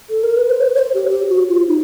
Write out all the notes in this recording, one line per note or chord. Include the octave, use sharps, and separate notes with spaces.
A4
A#4
B4
C5
C#5
C5
C#5
C5
G4
G4
F#4
F4
D#4